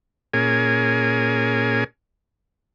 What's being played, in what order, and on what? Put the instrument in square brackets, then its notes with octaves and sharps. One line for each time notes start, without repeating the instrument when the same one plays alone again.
[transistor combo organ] A#2 C#4 G#4 A#4 G#5